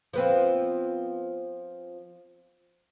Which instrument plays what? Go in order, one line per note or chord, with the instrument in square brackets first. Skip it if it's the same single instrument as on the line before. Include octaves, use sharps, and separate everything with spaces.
[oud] F3 B3 C4